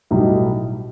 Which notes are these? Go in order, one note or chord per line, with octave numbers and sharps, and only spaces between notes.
B1 A2 G3 D#4 G4